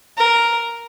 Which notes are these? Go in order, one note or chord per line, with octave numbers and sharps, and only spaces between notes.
A#4